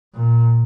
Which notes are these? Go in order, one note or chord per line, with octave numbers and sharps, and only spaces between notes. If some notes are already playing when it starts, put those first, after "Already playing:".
A#2